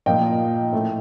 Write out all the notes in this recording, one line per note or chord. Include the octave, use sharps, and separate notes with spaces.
A#2 F3 A#3 D#5 G5
A2 A3